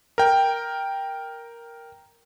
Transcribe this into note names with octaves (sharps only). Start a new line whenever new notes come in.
A#4 G5